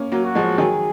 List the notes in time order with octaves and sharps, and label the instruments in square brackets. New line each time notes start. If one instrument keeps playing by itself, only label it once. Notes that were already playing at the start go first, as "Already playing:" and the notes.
Already playing: [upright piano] A#3 C#4
F#3 A#3
[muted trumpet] F#4
[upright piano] F3 G#3
[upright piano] D#3 F#3 [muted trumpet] G#4